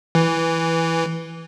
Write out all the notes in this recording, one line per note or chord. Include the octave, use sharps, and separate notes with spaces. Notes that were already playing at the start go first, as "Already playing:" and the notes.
E3